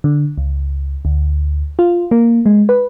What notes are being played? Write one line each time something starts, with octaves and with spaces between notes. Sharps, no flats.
D3
C#2
D2
F4
A#3
G#3
B4